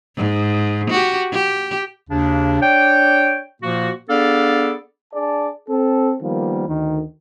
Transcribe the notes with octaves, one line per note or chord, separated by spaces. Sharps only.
G#2
F#4 G4
G4
D#2 C#3 D4
D4 C#5 D5 G5
A#2 F3 A#3 F#4
B3 D4 G#4 A4 D5 F5
D4 G#4 D5 A5
C4 A4
D#3 F3 G3 A#3 B3
D2 D#3